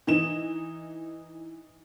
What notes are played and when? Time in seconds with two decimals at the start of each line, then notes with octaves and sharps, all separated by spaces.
0.07 E3 D#4 E7